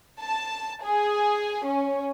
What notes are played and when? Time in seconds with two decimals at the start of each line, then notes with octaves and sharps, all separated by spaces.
0.21 A5
0.84 G#4
1.66 C#4